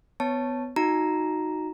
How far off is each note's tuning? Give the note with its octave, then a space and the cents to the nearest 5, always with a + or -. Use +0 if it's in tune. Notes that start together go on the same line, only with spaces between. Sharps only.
B3 +25 C#5 +0 A5 +0
D#4 +0 F#4 -15 A#5 +0